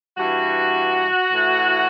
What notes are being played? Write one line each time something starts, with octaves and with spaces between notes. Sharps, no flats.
G2 E3 F#4
A2 E3